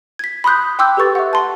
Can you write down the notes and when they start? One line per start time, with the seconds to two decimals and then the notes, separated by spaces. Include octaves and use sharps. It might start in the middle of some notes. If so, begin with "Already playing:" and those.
0.19 G#6 B6
0.44 B5 C6 D#6 F#6 G6
0.79 G5 C6 D6 E6 F#6 G6
0.97 G4 A4 B4 C#6 A6
1.15 E5 F#5
1.33 A5 C6